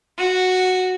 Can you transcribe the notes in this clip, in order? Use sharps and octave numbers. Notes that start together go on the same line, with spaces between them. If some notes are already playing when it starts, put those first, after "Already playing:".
F#4